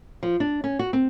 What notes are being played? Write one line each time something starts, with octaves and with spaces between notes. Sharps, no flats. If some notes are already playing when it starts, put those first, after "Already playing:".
F3
D4
C#4
F#4
C4